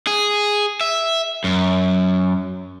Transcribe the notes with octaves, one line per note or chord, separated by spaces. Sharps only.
G#4
E5
F#2